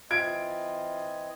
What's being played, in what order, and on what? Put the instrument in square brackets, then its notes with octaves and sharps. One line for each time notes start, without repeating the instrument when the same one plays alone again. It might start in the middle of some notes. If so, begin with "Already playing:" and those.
[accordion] E3 C4 D#5 [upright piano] F4 G#6 D7